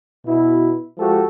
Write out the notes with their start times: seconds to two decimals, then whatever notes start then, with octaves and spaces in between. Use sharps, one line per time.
0.25 B2 E4
0.98 F3 G#3 F#4 G4 A4